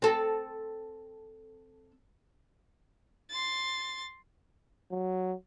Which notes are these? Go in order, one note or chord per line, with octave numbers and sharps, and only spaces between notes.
C4 A4
C6 A6
F#3